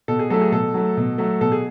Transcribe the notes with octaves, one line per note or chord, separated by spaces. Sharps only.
B2 A4
G#4
F#3 A3 A4
G#4
B2 A4
F#3 A3
B2
F#3 A3
B2 A4
G#4